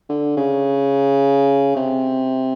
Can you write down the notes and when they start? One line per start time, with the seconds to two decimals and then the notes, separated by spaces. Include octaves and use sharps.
0.09 D3
0.37 C#3
1.76 C3